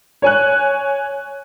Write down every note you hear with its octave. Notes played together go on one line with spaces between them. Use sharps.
C#5 G#5 F#6